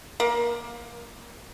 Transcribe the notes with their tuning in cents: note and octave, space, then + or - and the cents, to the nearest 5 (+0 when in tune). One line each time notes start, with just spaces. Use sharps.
A#3 +20